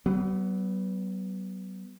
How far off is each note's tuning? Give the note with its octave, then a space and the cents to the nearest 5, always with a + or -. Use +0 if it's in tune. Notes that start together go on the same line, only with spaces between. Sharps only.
F#3 +45 B3 +0